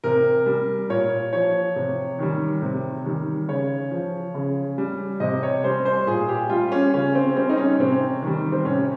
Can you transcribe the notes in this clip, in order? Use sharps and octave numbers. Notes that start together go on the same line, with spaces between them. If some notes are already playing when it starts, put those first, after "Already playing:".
C3 A#4
G3
A#2 C#5
F3 C#5
C3
D#3 G3
C3
D#3 G3
C#3 C#5
F3
C#3
G3
C3 D#5
C#5
G3 C5
C5
A#2 G#4
G4
G3 F4
C#4
C#3 C#4
C4
G3 C4
D#4
C#4
C3 C4
D#3 G3
C4
C3 C#4